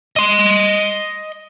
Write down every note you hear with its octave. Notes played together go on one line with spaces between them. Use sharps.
D#5 C6